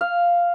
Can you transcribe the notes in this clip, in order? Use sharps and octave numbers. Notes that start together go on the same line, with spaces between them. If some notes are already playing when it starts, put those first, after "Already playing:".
F5